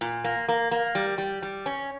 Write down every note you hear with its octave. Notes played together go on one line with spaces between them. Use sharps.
A#2
A#3
A#3
A#3
G3
G3
G3
C#4